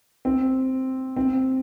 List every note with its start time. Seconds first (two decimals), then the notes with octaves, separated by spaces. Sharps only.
0.25 C4
1.16 C4